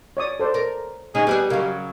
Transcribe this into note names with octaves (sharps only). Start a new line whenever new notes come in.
C#5 D5 D#6
A4 C5 D5
A#4
D3 C#4 D#4 G#4
G3 B3 D4 G#4
C#3 F#3 A#4 F5